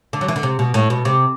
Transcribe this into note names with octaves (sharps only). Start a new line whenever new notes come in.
D3
F#3
E3
D3
C3
B2
A2
B2
C3